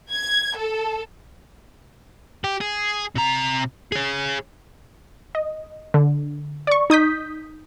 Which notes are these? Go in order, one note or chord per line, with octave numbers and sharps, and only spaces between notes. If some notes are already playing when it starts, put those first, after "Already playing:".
G#6
A4
G4
G#4
C3 A#5
G#4 C#5
D#5
D3
D5 C#6
D#4 D#6 G6 B6